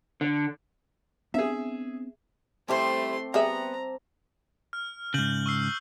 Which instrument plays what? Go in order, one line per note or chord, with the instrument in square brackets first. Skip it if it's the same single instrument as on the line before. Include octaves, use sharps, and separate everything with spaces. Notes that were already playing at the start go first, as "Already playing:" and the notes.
[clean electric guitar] D3
[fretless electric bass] B3 C4 D4 [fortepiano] G#4 E5
[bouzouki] G3 E4 C5 [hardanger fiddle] A3 C6 [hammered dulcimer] C4 A5 D6
[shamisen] G3 G#4 E5 [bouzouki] B3 [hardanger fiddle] A#5
[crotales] F6
[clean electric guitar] G#2 C#3 [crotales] F6 G6 F#7
[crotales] C#6 E6 C7